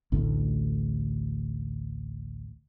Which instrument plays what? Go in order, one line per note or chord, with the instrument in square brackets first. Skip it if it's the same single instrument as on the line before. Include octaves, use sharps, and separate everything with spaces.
[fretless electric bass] A1 D2 A2